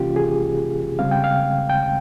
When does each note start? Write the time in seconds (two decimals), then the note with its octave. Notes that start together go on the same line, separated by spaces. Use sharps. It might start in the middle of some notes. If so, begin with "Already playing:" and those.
Already playing: C3 E3 A#3 C#4 F4 G4
0.16 G#4
0.99 C#3 G3 C4 F5
1.11 G5
1.24 F5
1.70 G5